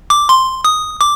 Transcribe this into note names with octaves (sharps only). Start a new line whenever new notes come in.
D6
C6
D#6
D6